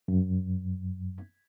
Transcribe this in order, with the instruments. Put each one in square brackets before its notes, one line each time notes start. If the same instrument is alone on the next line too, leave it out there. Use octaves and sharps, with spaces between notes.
[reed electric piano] F#2